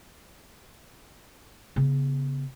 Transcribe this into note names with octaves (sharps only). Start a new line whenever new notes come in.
C#3 B3